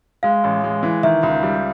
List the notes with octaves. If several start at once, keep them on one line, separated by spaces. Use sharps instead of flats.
G#3 F5
A1
G#3
E3
D#3 E5
C#2
G3